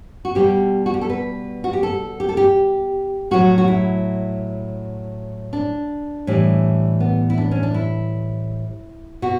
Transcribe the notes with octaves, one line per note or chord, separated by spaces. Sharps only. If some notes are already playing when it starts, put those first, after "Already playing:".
F#4
B2 G3 G4
F#4
G4
A4
B4
F#4
G4
A4
G4
A4
G4
A2 F#3 F#4
F#4
E4
D4
A2 E3 G3
B3
E4
D4
C#4
D4
E4
B2 F#4